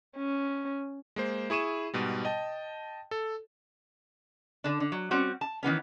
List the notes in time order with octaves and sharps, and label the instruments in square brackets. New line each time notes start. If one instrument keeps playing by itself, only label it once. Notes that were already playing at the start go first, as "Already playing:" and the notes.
[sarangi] C#4
[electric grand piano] G#3 A#3 C5
E4 G#4 C#6 D#7 E7
G#2 B2 G3
D#5 G5 A5
A4
[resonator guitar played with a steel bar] D3 D4
D3
F#3
G3 C4 C#4 F#4
A5
D#3 E3 B3 C#4